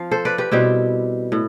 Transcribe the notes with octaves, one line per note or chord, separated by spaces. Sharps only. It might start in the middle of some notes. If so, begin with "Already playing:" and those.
Already playing: F3 C4 F5
A4 C5
B4 D5
G4 B4
B2 G3 C4 E4 G4
A2